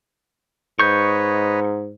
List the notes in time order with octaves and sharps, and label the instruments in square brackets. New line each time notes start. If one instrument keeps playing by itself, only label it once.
[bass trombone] G#2 [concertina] B4 C#5 D#5 [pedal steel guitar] C#6 G6